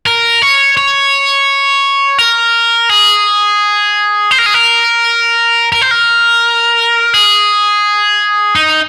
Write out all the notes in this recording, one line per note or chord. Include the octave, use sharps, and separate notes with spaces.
A#4
C#5
C#5
A#4
G#4
C5
A#4
G#4
A#4
A#4
C5
A#4
G#4
D#4